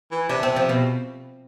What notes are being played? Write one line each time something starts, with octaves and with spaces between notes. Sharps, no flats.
E3
C3 D4
C4
F3
B2